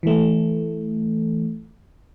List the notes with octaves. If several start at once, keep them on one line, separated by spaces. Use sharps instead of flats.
E3 A3